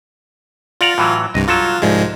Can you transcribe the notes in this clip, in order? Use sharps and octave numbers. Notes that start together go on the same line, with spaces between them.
F4 D5 F#5 A#5
A2 E3 F#3
C2 G2 D#5
F#3 F4 A4
C2 G#2 F3 G#3